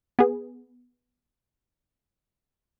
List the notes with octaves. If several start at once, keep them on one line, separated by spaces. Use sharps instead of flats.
B3 G#4